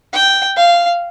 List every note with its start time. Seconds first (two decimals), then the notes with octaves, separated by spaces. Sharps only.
0.13 G5
0.57 F5